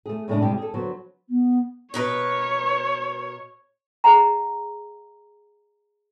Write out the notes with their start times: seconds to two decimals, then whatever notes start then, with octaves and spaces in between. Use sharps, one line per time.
0.06 A3 G#4
0.28 A2 C#3 G#3 A3 C#4 D4
0.42 C3 G3 G#3 G4
0.57 G#4 A4
0.74 D3 F#3 B3 C5
1.28 B3
1.94 B2 A#4 B4 C#5
4.04 G#4 D#5 F#5 A#5